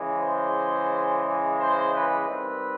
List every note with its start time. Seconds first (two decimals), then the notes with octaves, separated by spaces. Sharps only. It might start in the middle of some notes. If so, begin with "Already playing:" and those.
Already playing: C#3 E3 G#3
0.18 C5
1.58 C5
1.93 B4
2.28 D#3 G3 C4 B4